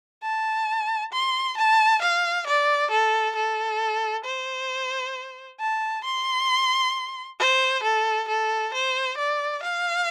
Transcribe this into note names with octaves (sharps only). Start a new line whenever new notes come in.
A5
C6
A5
F5
D5
A4
A4
C5
A5
C6
C5
A4
A4
C5
D5
F5